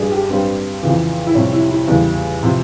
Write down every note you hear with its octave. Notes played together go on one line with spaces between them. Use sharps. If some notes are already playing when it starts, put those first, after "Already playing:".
Already playing: G2 G3 G#4
G4
G2 G3 C4
F2 C#3 E3
E4
F2 C3 G3 C#4
E4
E4
E2 C#3 G3
C3 F3